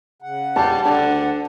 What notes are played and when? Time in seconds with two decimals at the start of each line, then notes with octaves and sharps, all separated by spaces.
0.22 C#3 F#5
0.56 G3 A5
0.86 D2 D3 D4 F#5